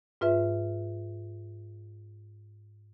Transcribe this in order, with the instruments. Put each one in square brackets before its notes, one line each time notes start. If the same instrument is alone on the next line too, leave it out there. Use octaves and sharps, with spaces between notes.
[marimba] G#2 F4 B4 E5